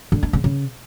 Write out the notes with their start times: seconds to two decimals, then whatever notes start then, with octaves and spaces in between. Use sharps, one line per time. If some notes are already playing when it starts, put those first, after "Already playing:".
0.12 D3
0.23 D4
0.33 C#3
0.44 C#3